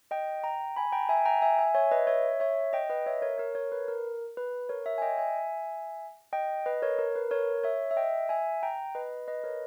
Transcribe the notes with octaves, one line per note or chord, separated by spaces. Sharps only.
D#5 G5
G5 A#5
G#5 B5
G5 A#5
E5 G#5
G5 A#5
E5 G#5
E5 G#5
C#5 E5
B4 D#5
C#5 E5
C#5 E5
D#5 G5
B4 D#5
C#5 E5
A#4 C#5
A#4 C#5
A#4 C#5
B4
A#4
B4
A#4 C#5
C#5 E5
G#5
D#5 G5
E5 G#5
D#5 G5
B4 D#5
A#4 C#5
A#4
B4
A#4 C#5
C#5 E5
E5
D#5 G5
E5 G#5
G5 A#5
B4 D#5
B4 D#5
A#4 C#5